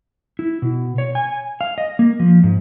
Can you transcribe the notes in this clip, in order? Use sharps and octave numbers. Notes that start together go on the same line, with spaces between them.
E4
B2
C#5
G#5
F5
D#5
A#3
F3
G#2